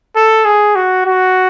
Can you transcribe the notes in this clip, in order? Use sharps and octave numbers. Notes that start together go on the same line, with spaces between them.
A4
G#4
F#4
F#4